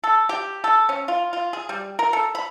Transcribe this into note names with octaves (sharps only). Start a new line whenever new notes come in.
A4
G4
A4
C#4
F4
F4
G#4
G3
A#4
A4
B5